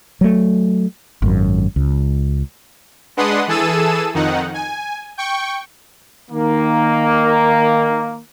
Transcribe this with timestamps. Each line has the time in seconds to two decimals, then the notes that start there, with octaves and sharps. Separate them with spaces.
0.21 F#3 A3
1.22 G#1 F#2
1.76 C#2
3.17 G#3 D4 B4 F#5 C6 D#6
3.47 E3 G#4 A4 A5 E6 D#7
4.14 F2 D#3 D#4 F#5
4.54 G#5
5.17 G5 C#6
6.31 D#3 A#3